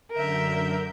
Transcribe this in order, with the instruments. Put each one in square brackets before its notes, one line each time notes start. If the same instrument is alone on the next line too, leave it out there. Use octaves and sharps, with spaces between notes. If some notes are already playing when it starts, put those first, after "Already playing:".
[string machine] F#2 D3 G6 [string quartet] A#4 E5